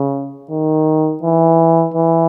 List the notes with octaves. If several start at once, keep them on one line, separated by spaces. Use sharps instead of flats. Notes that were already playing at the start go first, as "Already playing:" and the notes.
Already playing: C#3
D#3
E3
E3